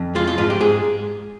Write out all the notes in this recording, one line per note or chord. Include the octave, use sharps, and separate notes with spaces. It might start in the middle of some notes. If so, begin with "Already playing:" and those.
Already playing: F2
G#3 F4
F4
G#2 F4
G4
G#2 G#4